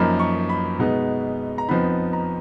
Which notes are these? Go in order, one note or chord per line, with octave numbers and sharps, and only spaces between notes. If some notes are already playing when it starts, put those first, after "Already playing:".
Already playing: F#2 F3 A#3 D#4 B5
C#6
B5
B2 G#3 B3 D#4
A#5
F2 F3 B3 D#4 B5
A#5